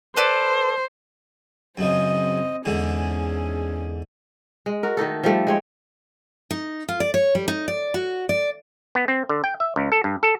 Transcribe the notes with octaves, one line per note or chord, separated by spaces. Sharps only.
A4 B4 C5 D5
F#2 C#3 C4 D#5
E2 G#2 D3 C#4 G#4
G#3
F#4 A#4
D#3 A3 D#4 A4
F3 G3 A3 A4
G#3 C4 C#5
D#4
F4
D5
C#5
G3
D#4
D5
F#4
D5
B3
C4
D3
G5
E5
C#2
A4
G2
A4